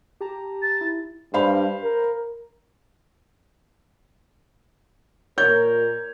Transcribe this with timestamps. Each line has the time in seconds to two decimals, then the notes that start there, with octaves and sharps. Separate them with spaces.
0.21 G4 A5 A#5
0.62 A6
0.81 E4
1.34 G2 C5 F5 B5
1.83 A#4
5.38 A#2 A#4 C#5 G6